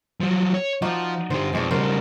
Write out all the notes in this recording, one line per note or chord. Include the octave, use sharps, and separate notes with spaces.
F3 F#3
C#5
F3 D#4 F#4 D5
D3 G4 C5
F2 B2 G#3 D4
C#3 G3 F#4 A#4 C5